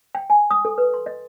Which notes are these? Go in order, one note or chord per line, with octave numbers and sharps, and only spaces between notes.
G5
G#5
D#6
A4
B4
C6
D#5